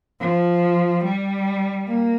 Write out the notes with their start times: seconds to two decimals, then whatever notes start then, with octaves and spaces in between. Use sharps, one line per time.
0.20 F3
1.04 G3
1.87 A#3